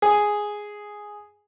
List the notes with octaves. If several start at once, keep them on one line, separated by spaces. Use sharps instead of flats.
G#4